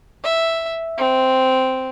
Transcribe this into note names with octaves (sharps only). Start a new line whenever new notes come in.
E5
C4